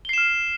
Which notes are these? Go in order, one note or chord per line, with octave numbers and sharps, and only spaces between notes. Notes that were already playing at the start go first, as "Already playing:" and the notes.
F6 C7 E7 G7